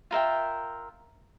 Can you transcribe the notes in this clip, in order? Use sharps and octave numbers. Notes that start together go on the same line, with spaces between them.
F4 A#4 E5 G5